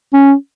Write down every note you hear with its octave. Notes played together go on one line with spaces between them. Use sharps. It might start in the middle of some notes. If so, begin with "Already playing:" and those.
C#4